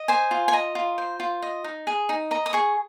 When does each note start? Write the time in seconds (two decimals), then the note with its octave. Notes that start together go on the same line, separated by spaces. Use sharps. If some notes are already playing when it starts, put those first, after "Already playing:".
Already playing: D#5
0.08 C5 G#5
0.31 F4
0.48 G#5
0.53 D#5 A#5
0.75 F4
0.98 C5
1.20 F4
1.42 D#5
1.64 D#4
1.87 G#4
2.09 D#4
2.31 D#5 A#5
2.46 D#6
2.53 G#4 C#6